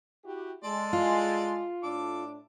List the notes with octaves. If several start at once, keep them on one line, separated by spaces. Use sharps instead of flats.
E4 F#4 G4
G#3 A4 D5 C6
F4
A2 D4 A4 D6